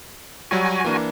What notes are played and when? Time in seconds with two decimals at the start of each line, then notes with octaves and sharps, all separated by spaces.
0.51 F#3 G3 F#4 G#5 D#7
0.84 E3 A#3 D4